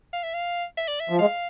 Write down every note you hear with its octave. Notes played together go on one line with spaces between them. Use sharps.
F5
E5
F5
E5
D5
E5
F3
G#3 F5